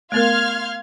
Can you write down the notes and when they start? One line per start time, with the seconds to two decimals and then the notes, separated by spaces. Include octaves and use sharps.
0.12 A3 B3 A#4 F5 C6 F6 G#6